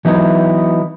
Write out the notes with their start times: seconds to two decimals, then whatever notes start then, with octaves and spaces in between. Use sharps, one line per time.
0.05 E3 F#3 B3 D#4 E4